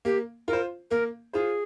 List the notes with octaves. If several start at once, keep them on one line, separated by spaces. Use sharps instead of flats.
A#3 G4
F4 A#4
C5
A#3 A#4
F4 G#4 C5